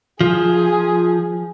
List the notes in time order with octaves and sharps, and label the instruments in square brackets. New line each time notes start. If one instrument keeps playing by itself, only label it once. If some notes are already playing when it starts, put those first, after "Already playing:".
[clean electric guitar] F3 [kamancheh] G#4